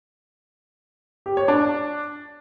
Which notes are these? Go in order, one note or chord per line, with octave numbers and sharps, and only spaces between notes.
G4
C#5
D4